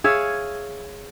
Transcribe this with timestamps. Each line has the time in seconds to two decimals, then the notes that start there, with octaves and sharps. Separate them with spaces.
0.04 G#4 C#5 E5 F5